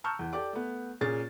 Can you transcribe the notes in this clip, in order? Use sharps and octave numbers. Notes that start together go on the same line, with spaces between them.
A5 A#5 C#6 E6 F6 G6
E2
G4 A4 D5 D6
A3 B3
A#2 C#4 G#4 A6